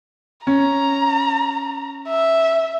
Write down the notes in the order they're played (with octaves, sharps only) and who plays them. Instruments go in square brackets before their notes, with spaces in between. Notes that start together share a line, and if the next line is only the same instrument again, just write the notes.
[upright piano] C#4 [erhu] A#5
[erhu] E5